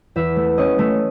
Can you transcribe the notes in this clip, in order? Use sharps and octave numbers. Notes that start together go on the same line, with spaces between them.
E2 E5
A3
C#4 D#5
A3